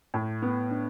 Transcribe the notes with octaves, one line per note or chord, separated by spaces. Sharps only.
A2
B3
D4